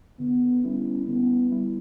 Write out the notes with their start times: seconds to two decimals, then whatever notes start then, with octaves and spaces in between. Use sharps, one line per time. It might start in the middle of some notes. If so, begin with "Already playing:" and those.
0.19 D3 B3
0.64 G3 B3 C#4 E4
1.07 D3 B3
1.51 G3 B3 E4